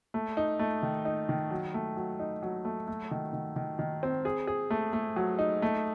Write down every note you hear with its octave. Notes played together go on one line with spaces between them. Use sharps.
A3
D#4
A3
D#3
D#4
D#3
F#3
A3
F#3
D#4
F#3
A3
A3
D#3
D#3
D#3
D#3
C4
G#4
G#4
A3
A3
F#3
D#4
A3